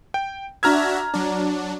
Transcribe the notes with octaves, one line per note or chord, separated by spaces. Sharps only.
G5
D4 F#4 E5 A#5 F6 G#6
F#3 D4